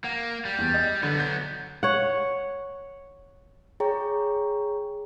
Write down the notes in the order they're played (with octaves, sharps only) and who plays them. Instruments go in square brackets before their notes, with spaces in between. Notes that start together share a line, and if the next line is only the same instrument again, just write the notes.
[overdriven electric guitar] A#3 [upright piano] F#5
[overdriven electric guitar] G3
[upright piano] E2
D#5
[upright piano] D3 [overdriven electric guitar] F#3 B3
[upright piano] G6
[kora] C#5 F#5
[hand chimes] G#4 C#5 G5 A#5 C#6